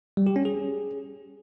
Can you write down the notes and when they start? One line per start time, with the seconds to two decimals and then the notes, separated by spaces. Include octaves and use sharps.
0.17 G3
0.27 G4
0.36 C#4
0.45 G#4